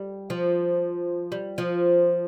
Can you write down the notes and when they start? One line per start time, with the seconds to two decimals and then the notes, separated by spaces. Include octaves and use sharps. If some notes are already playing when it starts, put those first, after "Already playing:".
Already playing: G3
0.30 F3
1.32 G3
1.58 F3